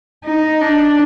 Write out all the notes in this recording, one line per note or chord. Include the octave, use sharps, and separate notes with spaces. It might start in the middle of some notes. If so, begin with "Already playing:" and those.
D#4
D4